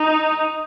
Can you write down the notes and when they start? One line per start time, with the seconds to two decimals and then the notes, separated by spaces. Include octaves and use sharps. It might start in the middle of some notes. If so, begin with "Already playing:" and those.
Already playing: D#4